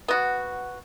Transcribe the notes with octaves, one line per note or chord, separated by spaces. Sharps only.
B3 F#4